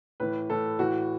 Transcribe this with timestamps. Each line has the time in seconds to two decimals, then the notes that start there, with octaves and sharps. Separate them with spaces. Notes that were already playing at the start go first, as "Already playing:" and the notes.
0.20 A2 E3 B4
0.49 A2 E3 A4
0.79 A2 E3 F#4